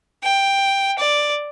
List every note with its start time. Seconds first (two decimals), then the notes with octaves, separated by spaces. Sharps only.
0.24 G5
0.99 D5